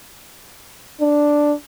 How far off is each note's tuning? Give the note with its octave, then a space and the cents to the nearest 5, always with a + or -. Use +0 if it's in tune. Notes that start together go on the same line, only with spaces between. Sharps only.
D4 +0